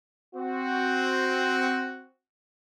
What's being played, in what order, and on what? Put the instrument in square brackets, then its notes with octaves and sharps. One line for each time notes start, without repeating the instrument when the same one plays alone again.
[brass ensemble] C4 F#4